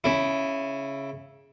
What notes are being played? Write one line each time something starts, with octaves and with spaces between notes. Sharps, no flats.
C#3 E4